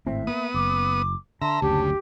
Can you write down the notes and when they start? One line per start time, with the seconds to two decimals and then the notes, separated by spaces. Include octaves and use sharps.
0.07 G#1 A2 C4 E5
0.27 A#3 B3 D#6
0.54 F#1 D6
1.42 D3 E5 A5 A#5 C6
1.62 F#1 D2 C#3 G4